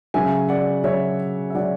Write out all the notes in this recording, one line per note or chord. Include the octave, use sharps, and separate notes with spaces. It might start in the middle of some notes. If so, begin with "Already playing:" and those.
C#3 F#3 E5 G#5
D5 F#5
C#3 F#3 C#5 E5
E5
C#3 F#3 D5 F#5